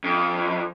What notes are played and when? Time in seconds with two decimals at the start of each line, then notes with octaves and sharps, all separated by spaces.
0.04 F2